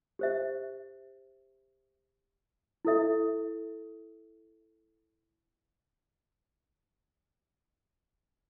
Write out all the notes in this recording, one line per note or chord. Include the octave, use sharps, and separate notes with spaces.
G4 C5 E5
E4 A4 E5